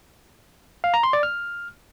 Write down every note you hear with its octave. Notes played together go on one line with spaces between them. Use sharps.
F5
A#5
C6
D5
F6